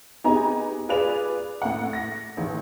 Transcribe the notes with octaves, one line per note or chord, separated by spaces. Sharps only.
B3 D#4 G4 G#4 G#5 A#5
F4 G#4 B4 D5 F7
A2 F#5
A#6
A1 D#3